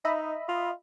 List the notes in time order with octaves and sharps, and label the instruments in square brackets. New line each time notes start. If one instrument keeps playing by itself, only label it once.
[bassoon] D#4 [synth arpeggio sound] D#5 E5 B5
[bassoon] F4